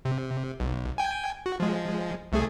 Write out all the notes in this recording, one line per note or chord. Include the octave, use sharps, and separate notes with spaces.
C3
B1
G5 G#5
F#4
F3 G#3
C2 A3 G#4